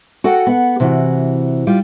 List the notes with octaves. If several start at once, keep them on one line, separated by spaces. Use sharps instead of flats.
F#4 A4 D#5 F#5 G5
B3 F#5
C3 E3 F#4
G3 F4